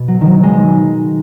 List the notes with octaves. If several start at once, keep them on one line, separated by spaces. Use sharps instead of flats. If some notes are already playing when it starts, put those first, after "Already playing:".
Already playing: B2 B3
F#3
D#3 F#3
G#3